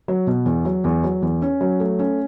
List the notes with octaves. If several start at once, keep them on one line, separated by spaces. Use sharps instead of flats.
F#3
B2
E2
F#3
E2
F#3
E2
C#4
F#3
A3
C#4